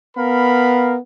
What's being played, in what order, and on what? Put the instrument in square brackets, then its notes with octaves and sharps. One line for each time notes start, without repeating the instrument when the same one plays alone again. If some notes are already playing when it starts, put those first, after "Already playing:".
[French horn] B3 [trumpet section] A#4 F5 B5